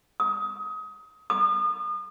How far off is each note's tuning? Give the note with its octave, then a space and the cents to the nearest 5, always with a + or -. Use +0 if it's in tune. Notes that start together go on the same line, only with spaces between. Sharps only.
D#6 +25
D#6 -40